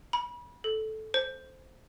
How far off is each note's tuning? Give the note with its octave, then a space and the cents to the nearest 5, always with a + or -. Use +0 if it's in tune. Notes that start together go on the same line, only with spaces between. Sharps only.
B5 -30
A4 -10
C5 +0